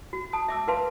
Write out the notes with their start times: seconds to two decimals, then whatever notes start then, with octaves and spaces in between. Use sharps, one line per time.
0.13 F#4
0.33 A5 D#6
0.48 E5 D6 E6
0.68 A#4 B4 F5 A5 C6